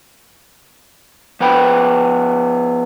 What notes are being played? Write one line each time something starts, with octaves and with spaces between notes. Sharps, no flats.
F3 B3 B4 G5 B5